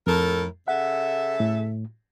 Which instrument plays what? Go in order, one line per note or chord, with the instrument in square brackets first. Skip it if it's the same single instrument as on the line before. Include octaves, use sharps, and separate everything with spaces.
[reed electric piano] F2 [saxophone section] A2 A4 A#4
[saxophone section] C#3 A4 E5 [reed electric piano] F#5
[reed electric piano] A2